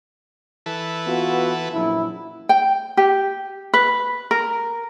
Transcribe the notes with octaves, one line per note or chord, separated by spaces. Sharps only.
E3 A4 B4
B3 F4 F#4
A#1 F#2 E4
G5
G4
B4
A#4